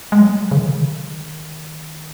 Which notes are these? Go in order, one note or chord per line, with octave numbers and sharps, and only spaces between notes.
G#3
F#3
C#3
D#3